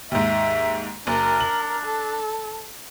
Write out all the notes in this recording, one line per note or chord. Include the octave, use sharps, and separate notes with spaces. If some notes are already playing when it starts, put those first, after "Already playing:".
D#2 G#2 E5
F#1 D4 A#4
F#7
A4